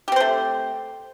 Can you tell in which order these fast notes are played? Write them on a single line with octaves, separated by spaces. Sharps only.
G4 C4 C5 A3